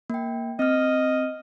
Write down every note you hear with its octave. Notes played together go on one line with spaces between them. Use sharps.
A#3 G5
C4 D#5 F6